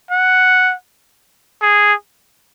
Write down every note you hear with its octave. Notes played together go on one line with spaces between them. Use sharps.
F#5
G#4